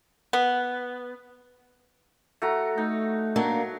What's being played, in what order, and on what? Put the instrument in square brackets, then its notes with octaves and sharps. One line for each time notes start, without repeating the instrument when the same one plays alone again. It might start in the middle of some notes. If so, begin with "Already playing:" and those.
[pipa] B3
[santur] A3 F#4 A#5
[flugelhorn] A3 [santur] D#4
[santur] F#3 [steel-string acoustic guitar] A#3 D4